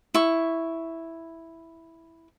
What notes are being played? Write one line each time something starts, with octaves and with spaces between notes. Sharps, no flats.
E4 C#6